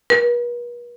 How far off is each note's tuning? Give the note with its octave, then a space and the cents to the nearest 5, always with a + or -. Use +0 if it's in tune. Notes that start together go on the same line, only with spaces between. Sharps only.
B4 -45